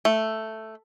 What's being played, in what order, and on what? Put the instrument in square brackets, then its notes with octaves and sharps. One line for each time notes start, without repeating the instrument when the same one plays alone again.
[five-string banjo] A3